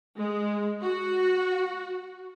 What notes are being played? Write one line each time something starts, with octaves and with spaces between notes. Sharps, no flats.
G#3
F#4